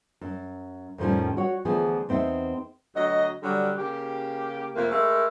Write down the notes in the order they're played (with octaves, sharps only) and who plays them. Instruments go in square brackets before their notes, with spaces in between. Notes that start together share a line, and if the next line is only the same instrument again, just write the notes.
[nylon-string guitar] F#2
F2 A2 D#3 F3 G3 C#4
F#4 C#5
D2 E3 F3 B3 G#4
E2 C4 D#4 E5
[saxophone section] D2 F#3 D#5
D3 F#3 G3
C#3 A#3 G4
F2 C3 A3 A#3
G#3 A3 E4 A#4